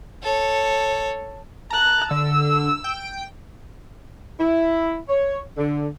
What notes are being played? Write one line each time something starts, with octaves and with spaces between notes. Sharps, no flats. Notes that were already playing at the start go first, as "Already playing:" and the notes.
A4 C#5
A5 A#5 F#6
D3 E6
G5
E4
C#5
D3